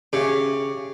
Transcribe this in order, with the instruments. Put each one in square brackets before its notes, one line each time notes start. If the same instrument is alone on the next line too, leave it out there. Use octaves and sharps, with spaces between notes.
[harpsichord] C#3 [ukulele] G4 C#5 E5